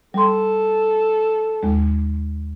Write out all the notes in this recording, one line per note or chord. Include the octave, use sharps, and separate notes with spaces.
G3 A4 C6
D#2 G#3